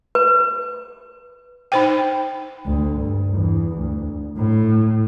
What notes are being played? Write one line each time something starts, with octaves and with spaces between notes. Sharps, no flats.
B4
D#4 C5 G5
D2
G2
E2
D2
A2